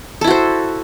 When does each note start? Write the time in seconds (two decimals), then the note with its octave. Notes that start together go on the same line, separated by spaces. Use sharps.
0.21 A4
0.24 E4
0.27 F#4
0.31 C5